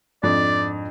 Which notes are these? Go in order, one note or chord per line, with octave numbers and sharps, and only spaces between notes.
F2 G#2 D4 D5